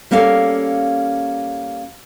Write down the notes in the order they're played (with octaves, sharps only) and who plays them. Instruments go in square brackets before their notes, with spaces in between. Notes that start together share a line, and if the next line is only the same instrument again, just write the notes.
[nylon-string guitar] G3 A#3 C#4 A4 F5